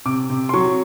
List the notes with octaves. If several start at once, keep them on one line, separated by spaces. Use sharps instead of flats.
C3 D6
C3
C6
F#3 C#6